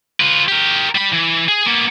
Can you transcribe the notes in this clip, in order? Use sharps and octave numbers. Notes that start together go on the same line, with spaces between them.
F4 B4
G4 A#4
G3 B5
E3
G#4
A#3 B3